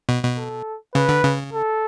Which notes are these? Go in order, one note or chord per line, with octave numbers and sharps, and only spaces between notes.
B2
B2
A4
C#3 B4
D3
C#3
A4